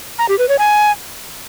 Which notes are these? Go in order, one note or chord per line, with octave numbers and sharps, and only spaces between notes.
A#5
G4
B4
C#5
G#5